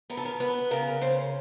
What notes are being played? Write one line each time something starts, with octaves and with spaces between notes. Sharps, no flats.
B3 A#4
A4
A#4
B3 B4
C#3 A#4
C#3 C5